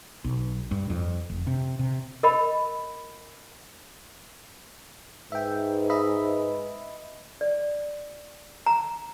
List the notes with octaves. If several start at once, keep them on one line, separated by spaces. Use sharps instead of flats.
B1
G2
F2
F1
C3
C3
A#4 D#5 G5 B5
G#2 B4 E5 G5
D#5 E5 B5
D5
A#5